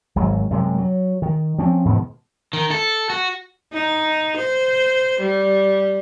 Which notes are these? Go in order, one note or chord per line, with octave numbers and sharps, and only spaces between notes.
G#1 G#2 F#3
F#2 C3 G#3
F#3
D#3
F3 C4 C#4
G#2 B2 D#3 F3
D#3
A4
F#4
D#4
C5
G3